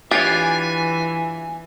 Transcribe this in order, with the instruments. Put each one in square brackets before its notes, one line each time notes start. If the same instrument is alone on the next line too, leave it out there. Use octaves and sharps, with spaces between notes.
[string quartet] E3 [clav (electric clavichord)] D4 F4 C#5 [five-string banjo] G4 [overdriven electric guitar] G#5